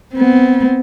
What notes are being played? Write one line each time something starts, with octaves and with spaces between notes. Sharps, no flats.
B3 C4